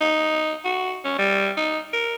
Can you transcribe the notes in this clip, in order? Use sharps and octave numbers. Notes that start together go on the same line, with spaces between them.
D#4
F#4
C#4
G3
D#4
A#4